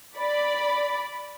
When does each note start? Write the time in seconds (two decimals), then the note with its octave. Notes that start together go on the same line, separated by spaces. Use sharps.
0.16 D5 B5